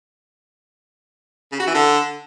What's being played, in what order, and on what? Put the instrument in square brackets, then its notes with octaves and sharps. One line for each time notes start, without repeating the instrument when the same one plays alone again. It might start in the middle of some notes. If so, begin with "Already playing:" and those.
[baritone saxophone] C#3
F#4
E3
D3